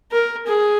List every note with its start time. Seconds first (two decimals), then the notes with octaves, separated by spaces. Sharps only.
0.12 A#4
0.47 G#4